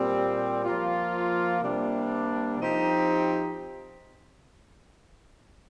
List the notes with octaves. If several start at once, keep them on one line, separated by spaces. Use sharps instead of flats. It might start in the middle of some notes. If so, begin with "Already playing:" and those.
Already playing: A#2 G3 C4 G4
F3 A#3 F4
C3 G3 A#3 D4
F3 C4 D#4 G4